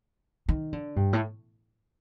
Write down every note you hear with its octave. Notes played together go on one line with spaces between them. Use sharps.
D#3
D3
G2
A2